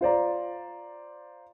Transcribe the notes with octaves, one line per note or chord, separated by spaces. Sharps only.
F4 C5 D5 A#5